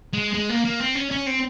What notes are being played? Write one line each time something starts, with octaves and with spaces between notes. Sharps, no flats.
G#3
G#3
A#3
A#3
C4
C#4
C#4
C4